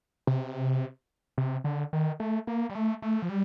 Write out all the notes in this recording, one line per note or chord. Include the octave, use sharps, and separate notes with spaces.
C3
C3
D3
D#3
A3
A#3
G3
A3
A3
F3
G3